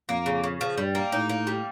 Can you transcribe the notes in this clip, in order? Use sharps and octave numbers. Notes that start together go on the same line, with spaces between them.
F2 A#3
C#3
C#3
F3
G2 G3
A#3
A2 D#4
A#3
G3